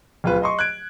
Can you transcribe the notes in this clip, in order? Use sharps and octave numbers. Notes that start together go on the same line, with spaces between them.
D1 F4 B4
D#5 C6 C#6
F#6 G#6 D7